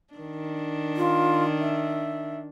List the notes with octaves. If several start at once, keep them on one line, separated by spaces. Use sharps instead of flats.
D#3 D4
F4
E5